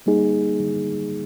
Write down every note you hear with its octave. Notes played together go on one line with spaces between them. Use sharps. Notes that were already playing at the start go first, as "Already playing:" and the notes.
G3 A#3 D#4 G#4